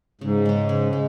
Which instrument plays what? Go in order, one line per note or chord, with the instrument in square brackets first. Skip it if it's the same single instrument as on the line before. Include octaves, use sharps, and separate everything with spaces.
[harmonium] G#2 [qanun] C#3
[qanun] G#3 C#4
C#3
G#3